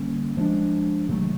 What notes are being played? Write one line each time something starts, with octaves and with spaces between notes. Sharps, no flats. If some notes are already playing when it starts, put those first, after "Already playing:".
Already playing: D3 G3 A#3 C#4
F3 G#3 B3 D4
C3 D#3 F#3 A3